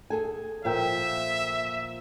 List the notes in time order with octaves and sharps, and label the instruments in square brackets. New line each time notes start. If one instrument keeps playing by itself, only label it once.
[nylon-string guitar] G#4 A4 G#5
[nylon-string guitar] A#2 F3 G5 [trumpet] E5